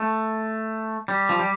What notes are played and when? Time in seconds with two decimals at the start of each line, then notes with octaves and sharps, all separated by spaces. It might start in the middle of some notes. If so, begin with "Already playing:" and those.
Already playing: A3
1.08 G3 G4
1.29 F3
1.39 G3